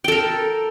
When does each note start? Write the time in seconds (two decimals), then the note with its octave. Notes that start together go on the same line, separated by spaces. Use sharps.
0.04 G5
0.08 A4
0.12 A#4